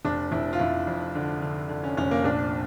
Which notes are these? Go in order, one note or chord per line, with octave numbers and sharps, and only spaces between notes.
F1 D4
F1 E4
F4
F1 E4
F2
D3
D3
D3
C#4
F1 C#4
A#3
A#1 D4